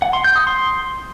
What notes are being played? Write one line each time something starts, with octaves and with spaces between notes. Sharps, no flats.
F#5
C6
G6
D#6
C6